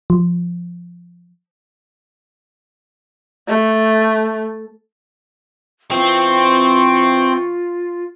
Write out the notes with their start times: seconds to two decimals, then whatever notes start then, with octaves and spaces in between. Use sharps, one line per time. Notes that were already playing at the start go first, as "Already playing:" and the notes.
0.10 F3
3.48 A3
5.91 E3 C4 F4 G5 C#6